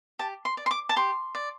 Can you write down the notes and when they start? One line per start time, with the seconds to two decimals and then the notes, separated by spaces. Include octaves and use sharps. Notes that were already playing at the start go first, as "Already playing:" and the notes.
0.19 G4 A5
0.45 C6
0.57 D5
0.66 C6
0.71 D6
0.89 A5
0.96 G4 C6
1.35 D5